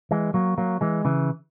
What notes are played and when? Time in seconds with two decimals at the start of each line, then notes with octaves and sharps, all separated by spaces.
0.11 E3 G#3
0.34 F#3 A#3
0.58 F#3 A#3
0.81 E3 G#3
1.05 C#3 E3